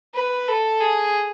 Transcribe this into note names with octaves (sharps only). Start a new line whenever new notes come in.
B4
A4
G#4